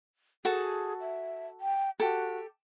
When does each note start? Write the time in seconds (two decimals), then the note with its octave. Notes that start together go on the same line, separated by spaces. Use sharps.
0.45 F#4 G#4 A4 A5
1.00 E5
1.60 G5
2.00 F#4 G4 A4